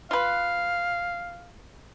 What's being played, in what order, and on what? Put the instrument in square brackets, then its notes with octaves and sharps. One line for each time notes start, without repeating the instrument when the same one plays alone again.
[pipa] F4 B4 [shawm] F5